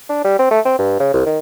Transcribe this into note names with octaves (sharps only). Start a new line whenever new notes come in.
D4
G3
C4
A3
C4
G2
C#3
C2
D#3